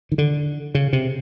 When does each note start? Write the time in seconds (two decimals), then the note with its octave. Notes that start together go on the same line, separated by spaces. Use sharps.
0.12 D#3
0.18 D3
0.75 C#3
0.93 C3